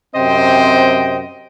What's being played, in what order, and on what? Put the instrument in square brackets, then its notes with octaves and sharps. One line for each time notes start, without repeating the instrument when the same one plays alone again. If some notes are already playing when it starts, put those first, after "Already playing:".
[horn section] F#2 C3 C4 C5 D#5 G5